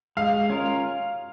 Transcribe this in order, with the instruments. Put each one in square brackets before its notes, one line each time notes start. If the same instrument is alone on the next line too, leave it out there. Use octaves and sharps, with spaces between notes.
[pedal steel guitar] G#3 [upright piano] F5
[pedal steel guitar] C#4 F4 A#4